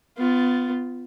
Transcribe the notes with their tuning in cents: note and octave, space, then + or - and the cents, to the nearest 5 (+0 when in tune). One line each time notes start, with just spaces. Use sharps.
B3 +25 F4 +0